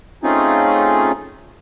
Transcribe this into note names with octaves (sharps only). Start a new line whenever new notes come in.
A3 C4 C#4 D#4 F4 G#4